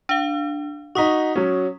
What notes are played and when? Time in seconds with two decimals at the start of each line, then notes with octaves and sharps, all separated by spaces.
0.09 D4 F5
0.95 D#4 F#4 C#6 D#6 B6
1.36 F#3 C#4